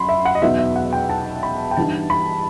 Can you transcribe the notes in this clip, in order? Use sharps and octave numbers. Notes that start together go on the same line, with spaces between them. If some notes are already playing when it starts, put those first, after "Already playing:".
Already playing: F#2 F#3 B5 C6
E5
F#5
D#5
E2 B2 F#3 B3 D#4 E5
E5
F#5
G5
A5
B5
G5
G2 E3 G3 D#4 A5
B5